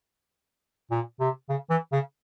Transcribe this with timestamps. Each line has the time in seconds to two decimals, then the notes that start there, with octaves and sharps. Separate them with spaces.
0.91 A#2
1.20 C3
1.49 C#3
1.70 E3
1.92 C#3